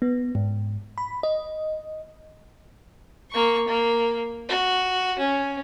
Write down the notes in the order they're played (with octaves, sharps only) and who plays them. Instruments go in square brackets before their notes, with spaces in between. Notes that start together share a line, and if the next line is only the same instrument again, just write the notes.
[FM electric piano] B3
G#2
B5
D#5
[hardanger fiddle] A#3 C#6
A#3
F#4
C#4